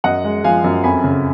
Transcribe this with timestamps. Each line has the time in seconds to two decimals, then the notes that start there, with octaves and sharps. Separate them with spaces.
0.04 F#2 D#5 F#5
0.24 G#3
0.44 F3 F5 G#5
0.64 F#2
0.84 F2 G#5 B5
1.04 C#3